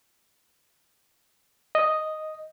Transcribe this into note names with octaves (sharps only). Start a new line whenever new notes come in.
D#5